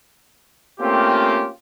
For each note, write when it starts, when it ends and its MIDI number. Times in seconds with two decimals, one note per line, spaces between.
0.80 1.47 57
0.80 1.47 58
0.80 1.47 60
0.80 1.47 61
0.80 1.47 65
0.80 1.47 67